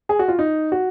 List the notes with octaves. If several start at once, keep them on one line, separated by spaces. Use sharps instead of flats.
G#4
F#4
F4
D#4
F#4